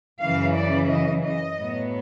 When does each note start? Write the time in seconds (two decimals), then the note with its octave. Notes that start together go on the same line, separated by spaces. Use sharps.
0.21 F#2 C#3 E3 F5
0.55 D5
0.89 D#5
1.23 D#5
1.57 A2 F#3 B3